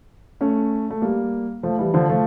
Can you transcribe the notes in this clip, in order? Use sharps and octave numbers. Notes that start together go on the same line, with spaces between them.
A3 C#4
A3
G3 A#3
F3 A3
E3 G3
D3 F3
F3 A3